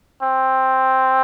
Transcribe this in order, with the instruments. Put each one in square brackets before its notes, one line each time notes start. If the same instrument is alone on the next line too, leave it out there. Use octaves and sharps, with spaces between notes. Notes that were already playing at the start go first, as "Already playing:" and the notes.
[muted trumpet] C4